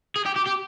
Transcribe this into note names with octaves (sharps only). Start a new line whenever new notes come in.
G#4
G4
G4
G4